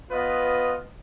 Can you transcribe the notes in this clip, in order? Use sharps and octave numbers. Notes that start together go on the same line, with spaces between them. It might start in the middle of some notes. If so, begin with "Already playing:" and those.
B3 F4 B4 D#5